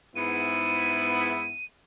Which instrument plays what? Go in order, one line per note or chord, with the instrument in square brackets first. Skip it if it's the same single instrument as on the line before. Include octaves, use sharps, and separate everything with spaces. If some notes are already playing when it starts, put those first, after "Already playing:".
[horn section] G#2 B3 E4 [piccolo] D#7